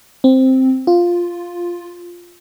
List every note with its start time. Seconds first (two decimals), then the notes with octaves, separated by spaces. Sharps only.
0.24 C4
0.87 F4